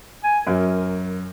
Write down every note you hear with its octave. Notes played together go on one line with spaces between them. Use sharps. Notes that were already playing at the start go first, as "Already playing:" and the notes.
G#5
F#2 A#4